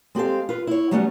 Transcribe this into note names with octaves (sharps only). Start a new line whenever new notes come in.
G#3 C4 G4 A4 F5
F4 B4
E4 C#5
F#3 G3 A3 B3 C#4